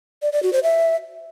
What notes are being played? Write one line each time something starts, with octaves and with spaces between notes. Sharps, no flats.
D5
D5
F#4
C5
E5